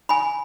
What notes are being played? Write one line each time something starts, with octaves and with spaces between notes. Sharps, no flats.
G#5 B5